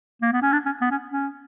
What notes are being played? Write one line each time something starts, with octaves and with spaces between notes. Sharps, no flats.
A#3
B3
C#4
D4
C#4
B3
C#4
C#4